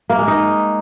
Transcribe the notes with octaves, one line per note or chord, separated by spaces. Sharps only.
A#3
G#3
D#4